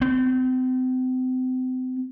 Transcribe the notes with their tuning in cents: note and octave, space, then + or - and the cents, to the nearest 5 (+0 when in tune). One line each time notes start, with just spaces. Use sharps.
C4 -35